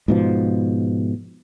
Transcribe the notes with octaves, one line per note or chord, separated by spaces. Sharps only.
G#2 B2 F3